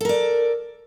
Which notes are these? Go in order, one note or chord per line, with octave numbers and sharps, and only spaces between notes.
A4 A#4 D5